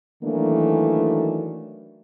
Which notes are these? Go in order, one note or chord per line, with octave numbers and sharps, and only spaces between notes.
D#3 E3 F#3 A3 A#3 D4